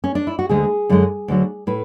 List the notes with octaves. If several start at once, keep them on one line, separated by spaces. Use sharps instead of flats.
C#4
D4
E4
F#4
D2 D3 G#3 G#4
F#2 D3 G#3
D2 D3 F#3
A2 B4